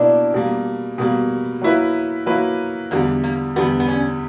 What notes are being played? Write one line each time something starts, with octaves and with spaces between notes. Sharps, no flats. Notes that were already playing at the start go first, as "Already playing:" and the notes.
Already playing: B2 A#3 D4 E4 A#4
B2 G3 A#3
B2 G3 A#3
F#3 A#3 E4 B4
F#3 A#3 E4 B4
E2 D3 G3 A#3
A#3
E2 D3 G3 B3
B3
C#4